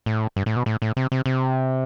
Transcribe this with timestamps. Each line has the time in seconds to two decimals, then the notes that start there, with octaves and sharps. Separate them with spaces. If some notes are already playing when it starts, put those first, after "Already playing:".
0.06 A2
0.36 G2
0.46 A2
0.56 B2
0.66 A2
0.82 A2
0.97 C3
1.12 C3
1.26 C3